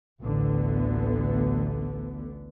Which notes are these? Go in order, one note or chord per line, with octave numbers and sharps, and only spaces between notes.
A1 D2 D3 B3